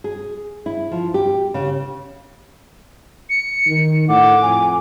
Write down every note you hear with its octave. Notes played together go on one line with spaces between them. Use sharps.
G#4
E4
F3
G4
C#3
C#7
D#3
A2 F#5 D6
F2 G#5